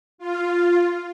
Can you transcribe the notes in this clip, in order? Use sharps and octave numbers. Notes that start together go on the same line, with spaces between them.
F4